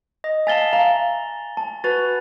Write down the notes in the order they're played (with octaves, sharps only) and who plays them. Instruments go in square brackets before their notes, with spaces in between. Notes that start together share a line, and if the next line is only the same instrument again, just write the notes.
[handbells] D#5
[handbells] E5 F5 A5 [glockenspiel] G#5 A6 G7
[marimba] F5 [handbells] A#5
[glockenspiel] A5
[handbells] F#4 B4 [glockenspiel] A6